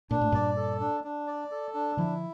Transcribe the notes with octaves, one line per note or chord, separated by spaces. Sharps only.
A#2 D4
A2
G2 A#2 D5
A4
D4
D4
D5
A4
D4
D3 F3 E4